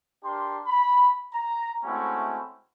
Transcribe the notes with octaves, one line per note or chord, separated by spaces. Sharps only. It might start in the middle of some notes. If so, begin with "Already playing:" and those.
D4 G4 A#4 C6
B5
A#5
G#3 A3 C4 C#4 E4 F#4